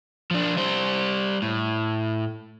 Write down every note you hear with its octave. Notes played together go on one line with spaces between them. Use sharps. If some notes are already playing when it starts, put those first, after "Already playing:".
F3 D4
G3 C5
A2